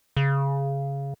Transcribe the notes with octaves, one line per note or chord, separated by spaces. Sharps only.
C#3